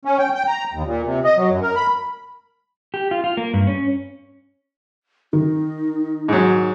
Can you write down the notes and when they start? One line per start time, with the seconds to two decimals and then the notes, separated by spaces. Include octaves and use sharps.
0.05 C#4
0.18 G5
0.34 G5
0.48 A#5
0.73 D#2
0.86 A#2
1.05 C3
1.24 D#5
1.37 F#3
1.50 F#2
1.61 A#4
1.75 B5
2.94 G4
3.11 F4
3.24 F4
3.37 A#3
3.54 G2
3.67 C#4
5.33 D#3 D#4
6.28 G#2 F#3